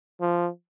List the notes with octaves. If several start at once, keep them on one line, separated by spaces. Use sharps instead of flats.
F3